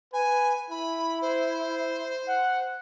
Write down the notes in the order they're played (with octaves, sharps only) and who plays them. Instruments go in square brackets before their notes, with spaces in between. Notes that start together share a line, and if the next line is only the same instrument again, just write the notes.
[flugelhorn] B4 [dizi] G#5
[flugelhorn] E4 [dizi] B5
[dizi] C5
[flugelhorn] F#5